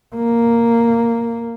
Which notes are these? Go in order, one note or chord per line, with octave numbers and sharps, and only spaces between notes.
A#3